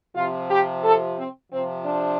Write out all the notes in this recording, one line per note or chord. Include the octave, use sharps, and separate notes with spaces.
C3 F3 F4
G4
A4
C4
C3 F3 C4
D4